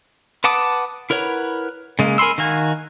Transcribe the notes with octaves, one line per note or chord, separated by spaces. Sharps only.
B4 F#5 A5 D6 D#6
E4 A#4 B4 C#5 F#5
C#3 G#3 A#3
A#4 G#5 B5 C6 E6
D#3 F#4 F5 G#5